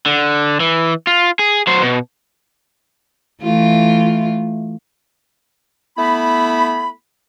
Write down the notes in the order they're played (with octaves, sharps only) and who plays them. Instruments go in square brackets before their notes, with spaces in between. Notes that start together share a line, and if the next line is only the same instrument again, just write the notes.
[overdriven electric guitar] D3
E3
F4
G#4
F#3 C5
B2
[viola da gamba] E3 A3 F4
[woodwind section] A3 B3 E4 B5